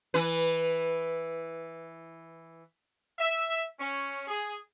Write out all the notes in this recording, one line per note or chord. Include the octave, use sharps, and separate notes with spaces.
E3 B4
E5
C#4
G#4